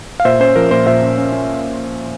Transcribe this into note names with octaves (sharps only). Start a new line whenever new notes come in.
F5
A#2 C5 E5
C#4 C5
F3 A#4
A#2 C5
A#2 C5 E5
C#4
C#4
C#4